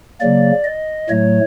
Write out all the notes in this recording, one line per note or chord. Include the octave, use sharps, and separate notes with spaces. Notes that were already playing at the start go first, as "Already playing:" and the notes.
C#3 F#3 A#3 D5
D#5
A2 F#3 A3 C#5